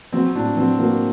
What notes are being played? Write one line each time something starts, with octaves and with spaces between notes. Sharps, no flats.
F#3 C4
A2 D4
F#3 C4
F#3 A#3